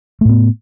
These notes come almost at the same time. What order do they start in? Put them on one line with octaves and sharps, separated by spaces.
A3 A2 B3